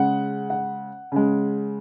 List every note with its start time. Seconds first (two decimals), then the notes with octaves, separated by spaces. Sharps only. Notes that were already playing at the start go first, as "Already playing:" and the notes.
Already playing: C#3 G#3 F#5
0.50 F#5
1.12 C#3 G#3